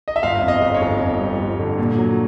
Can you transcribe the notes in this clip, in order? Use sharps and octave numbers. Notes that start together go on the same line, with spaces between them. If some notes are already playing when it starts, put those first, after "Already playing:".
D#5
E5
G1 F5
F2
D#5
G1
C#5
G1
F2
G3
G1
D3
A#2
F#3